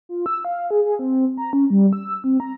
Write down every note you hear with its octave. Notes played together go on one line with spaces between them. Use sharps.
F4
E6
F5
G#4
G#4
C4
A#5
C#4
G3
E6
C4
A#5